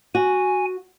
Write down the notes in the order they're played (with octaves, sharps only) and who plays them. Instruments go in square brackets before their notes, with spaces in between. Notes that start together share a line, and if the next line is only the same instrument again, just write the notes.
[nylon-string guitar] F#4 [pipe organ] G#5